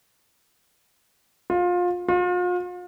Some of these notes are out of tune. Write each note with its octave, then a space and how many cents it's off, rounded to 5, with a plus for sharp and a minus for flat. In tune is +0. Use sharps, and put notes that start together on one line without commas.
F4 +25
F4 +40